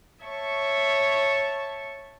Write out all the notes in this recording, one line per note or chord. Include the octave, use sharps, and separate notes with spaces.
C#5 E5 A5 C#6